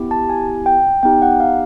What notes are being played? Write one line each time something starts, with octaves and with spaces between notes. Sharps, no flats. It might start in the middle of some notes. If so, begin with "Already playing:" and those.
Already playing: B3 E4 G4
A5
G#5
G5
B3 D#4 G4 G5
F#5
F5